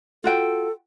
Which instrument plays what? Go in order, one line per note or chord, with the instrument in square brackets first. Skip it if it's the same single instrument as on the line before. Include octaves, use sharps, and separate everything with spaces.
[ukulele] F4 F#4 G5 [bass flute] A4